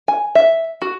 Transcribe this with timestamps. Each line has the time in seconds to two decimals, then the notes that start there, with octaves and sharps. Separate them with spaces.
0.08 G#5
0.35 E5
0.82 F#4